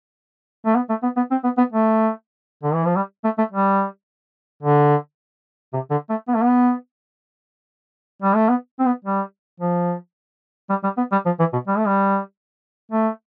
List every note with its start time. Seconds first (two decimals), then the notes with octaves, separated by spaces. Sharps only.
0.66 A3
0.75 B3
0.89 A3
1.03 B3
1.17 B3
1.31 C4
1.44 B3
1.58 B3
1.72 A3
2.63 D3
2.74 E3
2.86 F3
2.96 G3
3.24 A3
3.38 A3
3.52 G3
4.63 D3
5.73 C3
5.91 D3
6.10 A3
6.28 B3
6.35 A3
6.43 B3
8.22 G3
8.35 A3
8.49 B3
8.79 C4
8.86 B3
9.04 G3
9.60 F3
10.70 G3
10.84 G3
10.97 B3
11.12 G3
11.26 F3
11.39 E3
11.53 B2
11.67 G3
11.78 A3
11.87 G3
12.92 A3